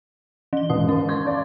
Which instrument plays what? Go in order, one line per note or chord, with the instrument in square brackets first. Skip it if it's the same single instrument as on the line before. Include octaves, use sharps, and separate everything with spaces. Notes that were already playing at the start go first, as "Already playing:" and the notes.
[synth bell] E3 G7
[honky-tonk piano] D#2 G#2 [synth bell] D#6
[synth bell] C#4
[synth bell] C6 C#6 [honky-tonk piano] G#6
[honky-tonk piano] D5 F5